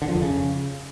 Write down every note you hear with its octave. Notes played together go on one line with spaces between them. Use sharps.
D3
F3
F2
C#3